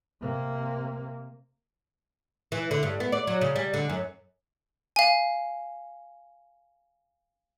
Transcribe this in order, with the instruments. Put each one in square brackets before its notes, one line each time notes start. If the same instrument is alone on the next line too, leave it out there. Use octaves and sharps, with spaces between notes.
[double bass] C3 A#3
[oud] E3
D3
G2
B3
D5
F#3
C#3
G3
D3
F#2
[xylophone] F5 G#5